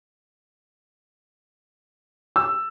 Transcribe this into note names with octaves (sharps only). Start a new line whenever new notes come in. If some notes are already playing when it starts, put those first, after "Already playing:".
E6